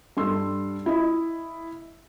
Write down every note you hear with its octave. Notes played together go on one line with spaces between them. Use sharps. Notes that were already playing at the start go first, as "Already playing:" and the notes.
G2 A4 C6 E6
E4 D#5